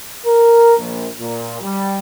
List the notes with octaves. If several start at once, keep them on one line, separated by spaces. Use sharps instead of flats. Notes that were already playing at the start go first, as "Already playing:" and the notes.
A#4
A#1
A#2
G3